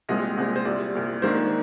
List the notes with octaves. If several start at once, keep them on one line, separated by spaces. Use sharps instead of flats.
C2 A#2 G#3 C4 D#5
C2 A#2 G#3 C4
C5
C2 A#2 G3 D5
C2 A#2 G3
G#2 D#3 A#3 D4 C5